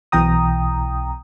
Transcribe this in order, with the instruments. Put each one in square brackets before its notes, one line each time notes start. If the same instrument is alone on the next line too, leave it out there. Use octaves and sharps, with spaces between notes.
[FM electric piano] B1 B2 E3 G5 A#5 D#6